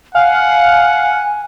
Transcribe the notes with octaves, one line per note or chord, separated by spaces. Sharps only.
F5 F#5 G#5